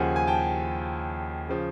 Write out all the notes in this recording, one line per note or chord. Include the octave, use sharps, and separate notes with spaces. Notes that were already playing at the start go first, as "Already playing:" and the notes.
Already playing: D#2 C#3 F3 F#5 G#5
G#5
G5 A5
C#3 F3